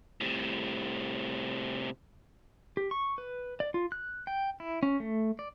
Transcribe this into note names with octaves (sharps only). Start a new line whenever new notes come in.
A2 C3
G4
C#6
B4
D5
F4
F#6
G5
E4
C#4
A3
D5